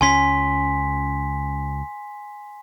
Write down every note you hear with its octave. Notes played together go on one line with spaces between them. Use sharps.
C#2 C#4 G#5 C6 B6